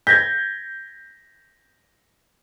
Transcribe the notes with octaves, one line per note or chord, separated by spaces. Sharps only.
G6 G#6 A#6 B6